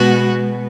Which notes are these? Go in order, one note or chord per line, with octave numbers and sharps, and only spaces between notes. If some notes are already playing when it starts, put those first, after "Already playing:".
Already playing: B2 G#3 B3 F#4